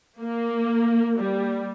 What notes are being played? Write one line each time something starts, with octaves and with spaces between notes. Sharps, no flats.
A#3
G3